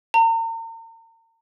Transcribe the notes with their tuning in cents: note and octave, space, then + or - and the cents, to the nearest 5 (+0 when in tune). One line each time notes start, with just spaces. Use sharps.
A#5 -40